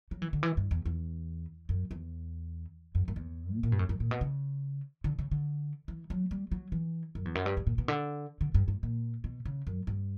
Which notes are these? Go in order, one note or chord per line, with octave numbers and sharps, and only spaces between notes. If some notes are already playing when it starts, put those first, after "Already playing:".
F#3
E3
D3
E3
G2
E2
E2
F#2
E2
F#2
F#2
E2
B2
A#2
G2
F#2
F#2
A#2
B2
C#3
D3
C#3
D3
E3
F#3
G3
F#3
E3
F#2
E2
F#2
G2
G2
A#2
B2
D3
D3
G2
G2
A#2
B2
C#3
F#2
G2